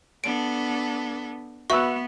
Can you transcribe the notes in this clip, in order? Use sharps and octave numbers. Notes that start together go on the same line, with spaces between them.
B3 D4 A4 D7
B3 F#4 B4 E5 C#6 E6